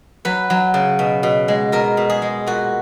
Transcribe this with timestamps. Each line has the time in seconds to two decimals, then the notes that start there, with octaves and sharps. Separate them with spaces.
0.25 F#3 B4
0.50 F#3
0.74 C#3
0.99 B2
1.23 B2
1.48 G#3
1.72 B2 A#4
1.97 B2
2.10 G#4
2.22 G#3
2.47 A#2 F#4